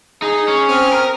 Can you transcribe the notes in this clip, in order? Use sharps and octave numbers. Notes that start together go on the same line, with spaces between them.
D#4 G#4
C#4
C4 D#6 F6
A#4